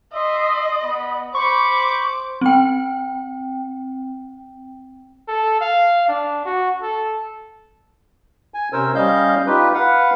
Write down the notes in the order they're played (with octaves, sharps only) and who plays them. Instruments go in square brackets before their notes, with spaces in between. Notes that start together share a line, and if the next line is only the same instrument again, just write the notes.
[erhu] D#5 [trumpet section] E5 C6
[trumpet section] B3 B5
[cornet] C5 [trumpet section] B5 [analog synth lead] C#6 [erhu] D6
[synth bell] C4 G5
[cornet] A4
F5
D4
F#4
A4
[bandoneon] G#5
C3 C#4 A#4 C5 E6
G3 C#4 D#5 F5 G6
D#4 F4 G4 B4
B4 F5 F#5